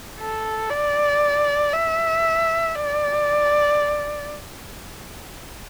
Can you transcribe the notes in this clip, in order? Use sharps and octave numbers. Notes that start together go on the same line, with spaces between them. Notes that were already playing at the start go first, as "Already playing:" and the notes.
A4
D5
E5
D5